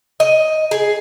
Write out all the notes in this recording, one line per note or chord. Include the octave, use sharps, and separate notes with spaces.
D#5
G#4